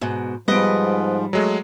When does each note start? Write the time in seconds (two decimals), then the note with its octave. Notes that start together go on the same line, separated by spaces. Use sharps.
0.01 G#2 B2
0.48 G#2 F3 G3 B3 B4 D#5 D7
1.33 F#3 G#3 A3